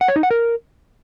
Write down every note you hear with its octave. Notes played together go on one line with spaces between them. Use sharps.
F#5
C#5
D#4
F#5
A#4